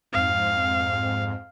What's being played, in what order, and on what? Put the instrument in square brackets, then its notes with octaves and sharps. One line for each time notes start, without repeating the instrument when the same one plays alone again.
[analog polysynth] F2 G#2 C4 [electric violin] F5